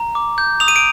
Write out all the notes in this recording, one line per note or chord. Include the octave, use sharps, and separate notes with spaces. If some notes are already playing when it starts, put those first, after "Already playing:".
Already playing: A#5
D6
G6
D#6 F7
D#7
D7